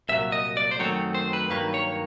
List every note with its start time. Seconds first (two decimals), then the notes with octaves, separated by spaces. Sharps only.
0.09 C2 A#2 F#3 E5
0.32 D#5
0.57 D5
0.71 C5
0.79 F#2 D#3 F#3 A3 C4 C#5
1.15 C5
1.33 B4
1.50 G2 D#3 F#3 A#3 B4
1.74 C#5